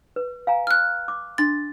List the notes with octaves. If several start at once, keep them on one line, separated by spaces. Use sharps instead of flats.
B4
F5 G#5 A#5
F6 F#6
D6
D4 C6 A6